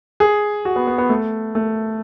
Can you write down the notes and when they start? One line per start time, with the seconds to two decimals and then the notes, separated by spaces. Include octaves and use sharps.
0.20 G#4
0.65 F#4
0.76 B3
0.87 B3
0.98 B3
1.10 A3
1.55 A3